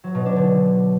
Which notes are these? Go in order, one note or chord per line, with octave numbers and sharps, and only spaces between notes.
F#3
B2
D4
D3